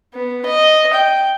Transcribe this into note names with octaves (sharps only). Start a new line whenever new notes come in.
B3
D#5
G5